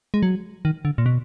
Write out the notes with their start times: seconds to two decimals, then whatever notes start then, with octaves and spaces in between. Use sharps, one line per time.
0.14 G#3
0.23 F#3
0.65 D#3
0.85 D3
0.98 A#2
1.06 B2